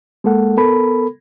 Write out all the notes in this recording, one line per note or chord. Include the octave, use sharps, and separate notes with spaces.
G#3 A#3 A4 F#5
B3 A4 A#4 B5